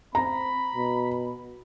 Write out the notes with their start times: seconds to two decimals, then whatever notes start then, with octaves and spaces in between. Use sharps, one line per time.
0.15 C4 A#5 B5
0.75 B2